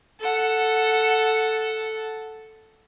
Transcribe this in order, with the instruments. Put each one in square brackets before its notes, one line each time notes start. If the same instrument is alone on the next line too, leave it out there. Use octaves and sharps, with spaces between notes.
[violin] A4 F#5